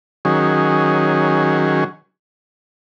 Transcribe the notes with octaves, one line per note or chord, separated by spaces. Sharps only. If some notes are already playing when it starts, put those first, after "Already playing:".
D#3 F#3 C#4 G#4